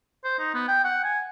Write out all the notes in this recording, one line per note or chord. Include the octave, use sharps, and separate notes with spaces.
C5
D#4
B3
G5
F#5
G#5